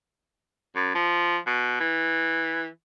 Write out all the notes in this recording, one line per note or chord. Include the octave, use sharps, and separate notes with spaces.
F#2
F3
B2
E3